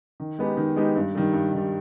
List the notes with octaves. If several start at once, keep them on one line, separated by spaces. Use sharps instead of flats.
D#3
G#3 B3 D#4 G4
D#3
G#3 B3 D#4 G4
G2
D#3 G3
G2
D#3 G3